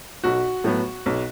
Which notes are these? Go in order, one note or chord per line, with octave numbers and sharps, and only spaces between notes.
B1 F#4
A2 F#3 B3
B1